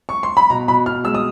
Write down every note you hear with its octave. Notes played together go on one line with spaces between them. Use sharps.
C#6
C6
B5
B2 A#5
B2 B5
B2 F6
G#3 E6
D#6